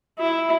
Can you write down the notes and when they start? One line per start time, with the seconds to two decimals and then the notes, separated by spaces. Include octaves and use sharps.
0.19 E4